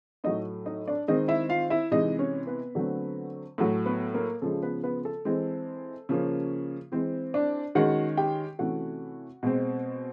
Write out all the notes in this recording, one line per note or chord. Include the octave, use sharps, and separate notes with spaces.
A2 F#3 A3 D#4 D#5
D#4 D#5
D4 D5
D#3 G#3 C4 D#4 D#5
E4 E5
F4 F5
E4 E5
C3 E3 G#3 D#4 D#5
C#4 C#5
B3 B4
D3 F#3 A3 C4
A2 F#3 A3
B3 B4
A#3 A#4
C#3 F3 G#3 A4
B3 B4
B3 B4
A4
E3 G#3 C4
C#3 F3 A#3 C#4
E3 G#3 C4 C5
D4 D5
D#3 G#3 C#4 F#4 F#5
G4 G5
C3 E3 A3 C#4 F#4 F#5
B2 G#3 C4